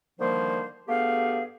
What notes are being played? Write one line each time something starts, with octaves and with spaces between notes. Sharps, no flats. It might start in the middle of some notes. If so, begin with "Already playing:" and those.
D3 D#3 F3 G3 A#3 C5
G2 A3 B3 G4 G#4 F5